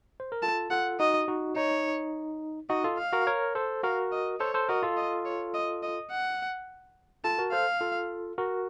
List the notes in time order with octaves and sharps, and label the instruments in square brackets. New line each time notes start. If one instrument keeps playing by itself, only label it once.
[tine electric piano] C5
A#4
[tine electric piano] F4 A4 [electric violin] A5
[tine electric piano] F4 A4 [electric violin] F#5
[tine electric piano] D#4 F#4 [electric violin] D#5
[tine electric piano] D#4 F#4
[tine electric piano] D#4 [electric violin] C#5
[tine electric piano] D#4 F#4 [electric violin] D#5
[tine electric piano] F4 A4
[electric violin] F5
[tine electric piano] F#4 A#4
A#4 C#5
A4 C5
[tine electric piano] F#4 A#4 [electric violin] F5
[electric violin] D#5
[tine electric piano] A4 C5 [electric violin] C#5
[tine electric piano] A4 C5
[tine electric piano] F#4 A#4 [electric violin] D#5
[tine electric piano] F4 A4
[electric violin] D#5
C#5
D#5
D#5
F#5
[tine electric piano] F4 A4 [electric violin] A5
[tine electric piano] F#4 A#4
[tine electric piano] A4 C5 [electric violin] F5
[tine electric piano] F4 A4
F#4 A#4